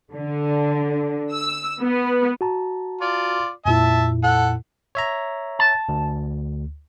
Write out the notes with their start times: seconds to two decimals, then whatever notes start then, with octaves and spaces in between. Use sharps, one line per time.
0.13 D3
1.33 E6
1.81 B3
2.41 F#4 A5 A#5
3.01 F4 D5
3.66 F2 A#2 E4 E5 A5
4.23 A4 F#5
4.95 C#5 E5 A#5
5.59 A5
5.89 D2